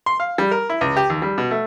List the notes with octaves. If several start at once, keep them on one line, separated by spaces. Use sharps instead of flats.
C6
F5
G3
A#4
E4
C#2
G4
D#2
G3
B2
A3